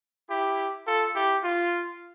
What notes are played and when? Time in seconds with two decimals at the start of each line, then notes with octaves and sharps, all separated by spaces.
0.30 E4 G4
0.86 F4 A4
1.15 E4 G4
1.43 F4